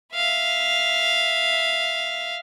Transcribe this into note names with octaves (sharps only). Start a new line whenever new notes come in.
E5 F5